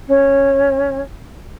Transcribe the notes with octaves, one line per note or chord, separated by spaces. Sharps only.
C#4